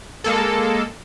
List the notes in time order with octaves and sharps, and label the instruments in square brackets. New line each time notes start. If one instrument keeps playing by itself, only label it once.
[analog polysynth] G#3 A#3 A4